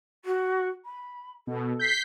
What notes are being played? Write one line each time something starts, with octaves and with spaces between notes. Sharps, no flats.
F#4
B5
B2 A4
G6 B6 C7